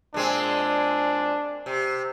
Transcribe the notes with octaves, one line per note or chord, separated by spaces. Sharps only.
A#2 G#3 C4 D4
C3